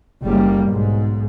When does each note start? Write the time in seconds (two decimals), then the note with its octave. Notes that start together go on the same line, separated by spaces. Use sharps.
0.22 F#1 G3 A#3
0.69 B1 G#2